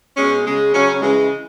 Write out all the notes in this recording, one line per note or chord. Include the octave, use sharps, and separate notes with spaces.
B2 G#3 C#4
C#3 G#3
C#3 F#3 C#4
C#3 E3 G#3